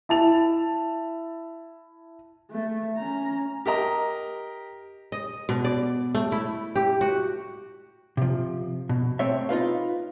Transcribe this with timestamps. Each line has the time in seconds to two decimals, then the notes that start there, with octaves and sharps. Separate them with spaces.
0.09 E4 A5 F7
2.50 A3
2.97 C#4 A#5
3.66 G4 A#4 D#5 A#5
5.12 D#5
5.49 B2
5.65 D5
6.15 A3
6.32 E4
6.76 G4
7.01 F#4
8.17 C3 F3
8.89 B2
9.19 A3 C4 C#5 E5
9.49 D#4 F4 B4 F5